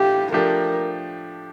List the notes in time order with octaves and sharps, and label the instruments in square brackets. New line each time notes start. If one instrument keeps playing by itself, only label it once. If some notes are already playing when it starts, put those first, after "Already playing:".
Already playing: [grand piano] A2 A3 D4 F4 [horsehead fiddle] G4
[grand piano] F3 A3 D4 G4 [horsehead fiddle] A#4